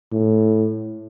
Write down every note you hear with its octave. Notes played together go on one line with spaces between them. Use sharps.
A2